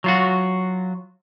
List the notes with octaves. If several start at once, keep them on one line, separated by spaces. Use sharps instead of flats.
F#3 F4 F#4